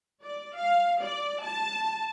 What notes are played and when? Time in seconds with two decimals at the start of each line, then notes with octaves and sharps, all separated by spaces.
0.23 D5
0.56 F5
1.01 D5
1.42 A5